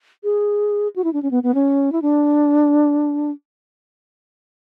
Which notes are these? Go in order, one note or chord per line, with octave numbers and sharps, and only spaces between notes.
G#4
F#4
E4
D4
C#4
B3
B3
C#4
E4
D4